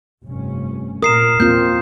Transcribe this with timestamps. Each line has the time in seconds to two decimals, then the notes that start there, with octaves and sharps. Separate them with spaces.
0.25 F1 G2 C#4
1.02 A#2 A#4 D#6 C7 E7
1.40 E2 A#2 A#3 C4 F4 G6